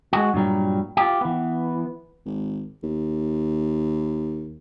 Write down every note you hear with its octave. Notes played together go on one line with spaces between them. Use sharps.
G#3 F#4
G2 A#2 F#3 G3
F4 G4
E3 B3
G#1
D#2